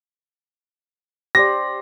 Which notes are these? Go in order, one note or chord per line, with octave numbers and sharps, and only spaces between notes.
G4 C5 D5 A#6